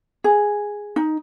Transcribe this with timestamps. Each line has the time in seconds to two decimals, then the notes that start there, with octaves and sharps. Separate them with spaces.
0.24 G#4
0.96 D#4